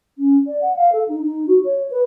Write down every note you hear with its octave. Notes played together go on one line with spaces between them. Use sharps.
C#4
D5
F#5
F5
A4
D#4
D#4
F#4
C#5
B4